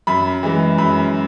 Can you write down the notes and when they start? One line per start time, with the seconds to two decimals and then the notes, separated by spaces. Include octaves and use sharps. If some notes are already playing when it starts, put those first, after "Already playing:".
0.07 F#2 B5
0.43 E3 G#3
0.78 F#2 B5